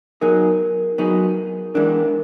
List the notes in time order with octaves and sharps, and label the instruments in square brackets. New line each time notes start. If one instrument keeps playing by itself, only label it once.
[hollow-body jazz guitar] F#3 B3 D#4 G#4 [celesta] A#4
[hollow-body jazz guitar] F#3 B3 D#4 G#4
[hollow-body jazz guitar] E3 G#3 B3 D4 [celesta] A#4